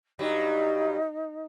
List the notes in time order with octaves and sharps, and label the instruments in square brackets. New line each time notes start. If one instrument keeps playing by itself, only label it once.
[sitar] G2 F#3 G3 [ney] D#4